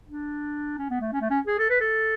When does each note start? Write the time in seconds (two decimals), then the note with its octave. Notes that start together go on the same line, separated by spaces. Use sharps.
0.09 D4
0.78 C#4
0.90 B3
1.01 A3
1.13 C#4
1.21 A3
1.30 C#4
1.47 G#4
1.59 A4
1.70 B4
1.81 A4